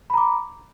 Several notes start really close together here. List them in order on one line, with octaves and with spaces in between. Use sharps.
B5 A#5 D6